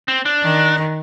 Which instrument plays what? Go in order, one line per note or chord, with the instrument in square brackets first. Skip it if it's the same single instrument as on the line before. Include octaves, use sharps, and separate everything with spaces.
[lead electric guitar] C4
D4
[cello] D#3